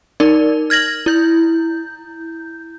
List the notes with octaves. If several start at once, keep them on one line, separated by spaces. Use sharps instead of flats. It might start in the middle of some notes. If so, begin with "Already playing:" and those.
D#4 A#4 D5
F6 G#6 A#6 F#7
E4 G6